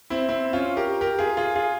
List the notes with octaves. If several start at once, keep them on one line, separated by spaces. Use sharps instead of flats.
C4 E4
C4 E4
C#4 F4
G4 A#4
G4 A#4
F4 G#4
F4 G#4
F4 G#4